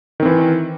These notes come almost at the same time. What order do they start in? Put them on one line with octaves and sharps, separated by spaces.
D#3 C4 E3